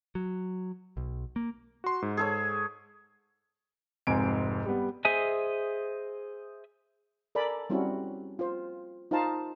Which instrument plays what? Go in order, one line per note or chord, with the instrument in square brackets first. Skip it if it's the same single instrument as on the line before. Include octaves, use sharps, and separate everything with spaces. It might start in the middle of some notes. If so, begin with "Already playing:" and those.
[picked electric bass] F#3
B1
A#3
[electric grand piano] F#4 C6
G#2
[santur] G#4 A4 C#5
[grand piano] F1 G#2 C4 G#5 D7
G3 B3
[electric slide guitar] G#4 C5 D#5 E5 G#5
[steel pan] A4 A#4 D5 G#5 A#5 B5
G3 C4 C#4 E4 F#4
F4 C5
D#4 F4 C5 F5 A5 A#5